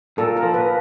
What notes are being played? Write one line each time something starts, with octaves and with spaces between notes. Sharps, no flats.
A#2 A4
A#4
F3
B4